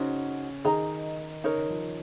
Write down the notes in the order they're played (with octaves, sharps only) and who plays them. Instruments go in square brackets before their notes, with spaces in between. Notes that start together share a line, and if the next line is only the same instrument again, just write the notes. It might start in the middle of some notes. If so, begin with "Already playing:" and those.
Already playing: [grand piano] C#3 C#4 [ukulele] D#4 F#4 C5
[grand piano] D#3 D#4 [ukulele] G#4 D#5 A#5
[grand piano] C#3 C#4 [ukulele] D#4 A#4 C#5
[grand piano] D#3
F3